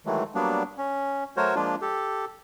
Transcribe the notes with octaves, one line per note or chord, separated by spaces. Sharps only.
D#3 E3 F#3 G#3 A3
F#3 G3 A#3 B3 D4
C#4
F#3 A3 F#4 A#4 C5 C#5
F3 G#3 A#3 D4 F4
G4 A4